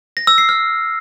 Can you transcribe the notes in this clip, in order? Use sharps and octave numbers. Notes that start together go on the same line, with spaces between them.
A#6
E6
C7
F6